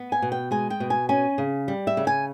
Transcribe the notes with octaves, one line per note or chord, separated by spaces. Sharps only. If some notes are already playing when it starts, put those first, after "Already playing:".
Already playing: B3
G#5
B2
G5
G#3 G#5
G5
B2
G#5
C#4 G#5
C#3
G3
E5
C#3
G#5